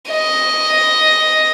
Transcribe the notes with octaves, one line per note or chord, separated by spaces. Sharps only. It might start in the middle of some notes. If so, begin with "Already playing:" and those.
D#5